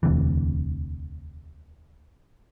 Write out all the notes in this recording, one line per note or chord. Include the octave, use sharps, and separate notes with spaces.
E1 D2 C3 E3